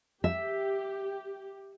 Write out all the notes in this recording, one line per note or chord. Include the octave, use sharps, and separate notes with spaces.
G4 E5